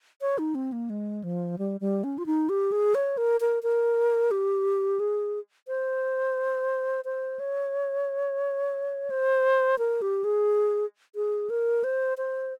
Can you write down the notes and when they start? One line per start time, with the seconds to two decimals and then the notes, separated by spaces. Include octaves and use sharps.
0.21 C#5
0.38 D#4
0.55 C4
0.72 A#3
0.90 G#3
1.24 F3
1.59 G3
1.81 G3
2.04 C#4
2.18 F4
2.26 D#4
2.49 G4
2.72 G#4
2.95 C#5
3.17 A#4
3.41 A#4
3.63 A#4
4.31 G4
5.00 G#4
5.68 C5
7.05 C5
7.39 C#5
9.10 C5
9.79 A#4
10.02 G4
10.24 G#4
11.15 G#4
11.50 A#4
11.84 C5
12.18 C5